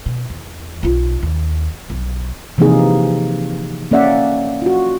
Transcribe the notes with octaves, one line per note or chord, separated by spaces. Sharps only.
B2
E2
B1 F4
D#2
B1
C3 E3 F3 A#3 D#4 G#4
A#3 C#4 D5 E5 F#5
F4 F#4